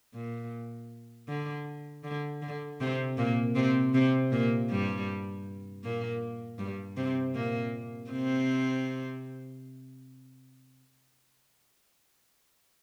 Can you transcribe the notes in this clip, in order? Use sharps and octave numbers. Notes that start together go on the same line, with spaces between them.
A#2
D3
D3
D3
C3 C4
A#2 A#3
C3 C4
C3 C4
A#2 A#3
G2 G3
A#2 A#3
G2 G3
C3 C4
A#2 A#3
C3 C4